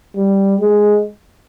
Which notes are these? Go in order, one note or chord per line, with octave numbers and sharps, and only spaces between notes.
G3
G#3